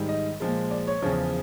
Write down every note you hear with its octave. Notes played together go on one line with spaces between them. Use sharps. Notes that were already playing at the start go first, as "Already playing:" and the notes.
Already playing: G#2 D#3 G3
D#5
A#2 F3 G#3
D5
C#5
E2 C#3 F3